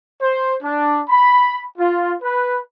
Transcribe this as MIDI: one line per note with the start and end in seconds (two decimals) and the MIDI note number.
0.20 0.54 72
0.61 1.00 62
1.08 1.63 83
1.77 2.14 65
2.22 2.60 71